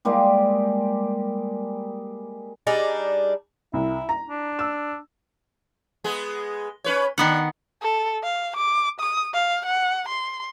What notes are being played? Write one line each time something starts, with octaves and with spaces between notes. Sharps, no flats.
G3 G#3 A#3 G4
G3 D4 D#4 G#4
C2 E4
A#5
D4
E6
G#3 B3 G#4
C#4 B4 C#5
D#3 B3 D4 F#5
A4
F5
D6
D#6
F5
F#5
C6